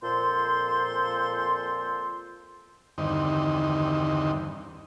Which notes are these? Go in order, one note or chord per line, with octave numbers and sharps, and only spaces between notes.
F2 A#2 A4 C5 C6
E2 G2 D3 D#3 C4 D#4